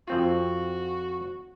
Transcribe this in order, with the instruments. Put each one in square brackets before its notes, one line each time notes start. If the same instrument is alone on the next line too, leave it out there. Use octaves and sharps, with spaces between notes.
[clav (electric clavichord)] F2 C4 F4 [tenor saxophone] F#4